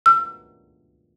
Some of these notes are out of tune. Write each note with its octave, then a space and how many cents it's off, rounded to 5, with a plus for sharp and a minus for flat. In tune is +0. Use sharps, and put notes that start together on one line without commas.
E6 +35